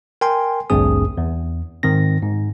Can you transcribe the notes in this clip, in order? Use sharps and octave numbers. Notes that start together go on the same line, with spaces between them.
A#4 G5 G#5 C6
A1 D2 G2 C4 G#4 D#6
E2
G#2 D#3 C4 A#6
G#2